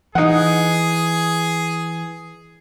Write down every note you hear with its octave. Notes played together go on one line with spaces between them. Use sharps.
E3 D#4 G#4 F#5